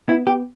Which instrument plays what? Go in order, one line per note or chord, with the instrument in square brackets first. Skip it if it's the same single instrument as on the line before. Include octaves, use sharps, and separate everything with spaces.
[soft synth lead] B3 [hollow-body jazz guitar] E4
[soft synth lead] B3 [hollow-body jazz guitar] G4